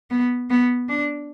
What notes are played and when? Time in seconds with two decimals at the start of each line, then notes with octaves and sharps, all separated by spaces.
0.10 B3
0.50 B3
0.89 D4